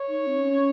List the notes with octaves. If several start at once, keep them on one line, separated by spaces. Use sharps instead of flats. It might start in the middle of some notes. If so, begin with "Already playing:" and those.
Already playing: C#5
D#4
C4
C#4